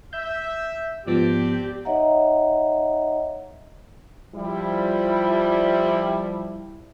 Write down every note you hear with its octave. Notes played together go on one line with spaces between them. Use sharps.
E5 G6
G#2 F3 B3 C4 D4 G4 D5
D#4 C#5 D#5 E5 F#5 A#5
F3 G3 E4